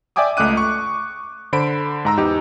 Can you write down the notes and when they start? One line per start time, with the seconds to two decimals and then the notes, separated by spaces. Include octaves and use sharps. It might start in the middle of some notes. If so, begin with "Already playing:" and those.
0.16 D5 E5 G5 G#5 D6 D#6
0.37 C#2 A3 D#5 D6 F#6 D#7
0.57 C#6
1.53 D3 C5 B5 D7
2.05 G#2 A#5 E6
2.17 E2 D#4 G4